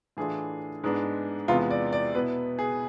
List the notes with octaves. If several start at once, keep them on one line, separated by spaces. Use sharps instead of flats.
A2 E3 A3 D4 F4 G#4
G#2 G#3 B3 D4
E2 C3 G#3 B3 F4
D5
D5
B2 B3 E4 B4
G#4